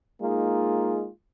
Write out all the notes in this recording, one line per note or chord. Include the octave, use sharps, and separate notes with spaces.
G#3 A#3 D#4 F4 G#4